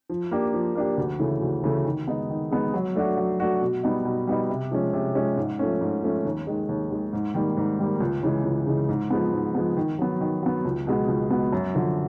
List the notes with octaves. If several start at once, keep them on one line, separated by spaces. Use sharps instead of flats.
F3
A#3 D4 G4
F3
A#3 D4 G4
D2
C#3 E3 A3
D2
C#3 E3 A3
D#3
G#3 B3 D#4
D#3
G#3 B3 D#4
F#3
A3 D4 F#4
F#3
A3 D4 F#4
B2
G3 B3 D#4
B2
G3 B3 D#4
C3
F3 G#3 C#4
C3
F3 G#3 C#4
G#2
F3 A3 C#4
G#2
F3 A3 C#4
D#2
D#3 G#3
D#2
D#3 G#3
G#2
D#3 G3 A#3
G#2
D#3 G3 A#3
C#2
C#3 E3 G#3
C#2
C#3 E3 G#3
G#2
F3 G#3 B3
G#2
F3 G#3 B3
D#3
F#3 B3
D#3
F#3 B3
C#2
B2 G#3 B3
C#2
B2 G#3 B3
F#2
D3 F3